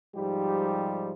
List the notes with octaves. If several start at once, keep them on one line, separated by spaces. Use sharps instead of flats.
G#2 F3 G3 D#4 G4